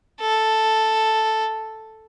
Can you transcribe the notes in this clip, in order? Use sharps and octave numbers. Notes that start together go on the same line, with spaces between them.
A4